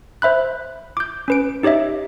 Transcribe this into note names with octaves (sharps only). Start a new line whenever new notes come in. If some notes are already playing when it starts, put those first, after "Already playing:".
C5 E5 B5 F#6
D6 G6
C#4 B4 D7
D#4 G4 C#5 D#5 E5